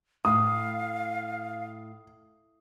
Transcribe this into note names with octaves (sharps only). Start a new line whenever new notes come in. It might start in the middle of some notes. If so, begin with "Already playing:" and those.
A2 F5 D#6